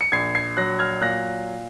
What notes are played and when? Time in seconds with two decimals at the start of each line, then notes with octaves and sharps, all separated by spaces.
0.01 C#7
0.12 A#1 G#6 C7
0.35 G#6 C7
0.57 F#3 F#6 A#6
0.79 F6 G#6
1.01 A#2 F#6 A#6